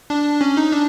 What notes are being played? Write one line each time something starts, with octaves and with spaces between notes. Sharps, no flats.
D4
C#4
D#4
D4